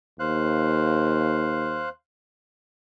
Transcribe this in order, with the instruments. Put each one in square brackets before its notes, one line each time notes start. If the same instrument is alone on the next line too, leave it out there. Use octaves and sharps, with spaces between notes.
[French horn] D#2 [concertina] C5 F5 F#6